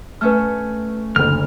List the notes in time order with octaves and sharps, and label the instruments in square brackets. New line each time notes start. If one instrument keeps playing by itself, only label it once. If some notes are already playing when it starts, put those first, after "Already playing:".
[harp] A3 C#4 [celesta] B4 F6
[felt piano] F#1 D2 [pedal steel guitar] F6